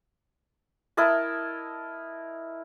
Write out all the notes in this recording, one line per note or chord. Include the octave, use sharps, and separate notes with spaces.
E4 A#4 D#5 A5